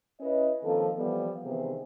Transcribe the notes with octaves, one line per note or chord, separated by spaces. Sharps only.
C#4 E4 B4 C#5 D#5
D#3 F3 A#3 C4 A4
E3 F3 G3 B3
C3 D#3 E3 B3 C4 G#4